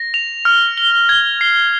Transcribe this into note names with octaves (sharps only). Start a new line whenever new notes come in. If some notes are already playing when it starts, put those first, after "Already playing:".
Already playing: A#6
F7
F6
G7
G#6
C7